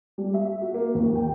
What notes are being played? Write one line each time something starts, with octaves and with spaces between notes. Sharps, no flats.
G3
E5
F#4
A#3
D#2
G5